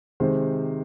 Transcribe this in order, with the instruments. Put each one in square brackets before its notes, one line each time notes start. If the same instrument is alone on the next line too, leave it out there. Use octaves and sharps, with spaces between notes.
[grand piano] C3 D#3 G#3 C5